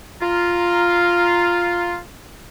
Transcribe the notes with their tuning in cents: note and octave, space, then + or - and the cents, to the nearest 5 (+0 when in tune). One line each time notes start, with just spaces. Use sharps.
F4 +0 A#5 +0